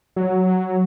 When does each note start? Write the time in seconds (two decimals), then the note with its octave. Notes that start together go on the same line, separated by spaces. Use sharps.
0.16 F#3